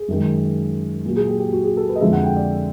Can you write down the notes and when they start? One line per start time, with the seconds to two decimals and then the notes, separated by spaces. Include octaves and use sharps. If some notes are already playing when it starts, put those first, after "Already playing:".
Already playing: G#4
0.08 F#2 D#3 G#3
1.05 A#2 F#3
1.16 G#4
1.28 G4
1.40 G4
1.53 F#4
1.64 G#4
1.77 A4
1.89 B4
1.96 D#5
2.01 F2 D3 F3 G#3 E5
2.13 F#5
2.24 G5
2.36 D5